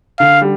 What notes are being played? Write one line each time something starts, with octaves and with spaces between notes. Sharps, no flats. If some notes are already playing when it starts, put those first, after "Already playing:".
D3 F5
G3